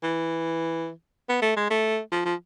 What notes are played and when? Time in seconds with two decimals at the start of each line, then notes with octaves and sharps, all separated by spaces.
0.03 E3
1.29 B3
1.42 A3
1.57 G#3
1.70 A3
2.12 F3
2.25 F3